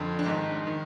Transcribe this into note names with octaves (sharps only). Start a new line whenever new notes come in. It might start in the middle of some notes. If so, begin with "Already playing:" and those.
Already playing: F2 D3
D4
G#2 D#3 D#4
D#3